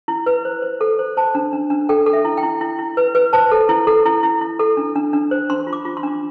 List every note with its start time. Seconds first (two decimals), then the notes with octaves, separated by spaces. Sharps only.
0.08 E4
0.26 B4
0.45 C5
0.62 C5
0.81 A4
0.99 C5
1.17 C5 A5
1.35 D4
1.53 D4
1.70 D4
1.89 A4 G5
2.06 A4
2.13 E5
2.25 E4
2.37 G5
2.43 E4
2.61 E4
2.79 E4
2.97 B4
3.15 B4
3.33 C5 A5
3.51 A4
3.69 E4
3.87 A4
4.06 E4
4.23 E4
4.41 E4
4.59 A4
4.77 D4
4.96 D4
5.13 D4
5.31 C5
5.50 D4 C6
5.67 F4
5.73 D6
5.85 F4
5.97 C6
6.03 D4